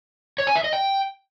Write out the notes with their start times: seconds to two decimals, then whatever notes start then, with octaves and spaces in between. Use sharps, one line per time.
0.38 C#5
0.47 G#5
0.56 E5
0.64 D#5
0.73 G5